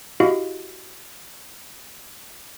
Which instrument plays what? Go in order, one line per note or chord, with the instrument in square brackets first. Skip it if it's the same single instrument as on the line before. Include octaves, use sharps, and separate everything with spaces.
[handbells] E4 F#4 G4 D#5 F5